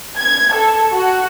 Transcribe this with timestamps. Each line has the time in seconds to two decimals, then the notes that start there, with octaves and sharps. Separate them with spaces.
0.20 G#6
0.53 A4
0.92 F#4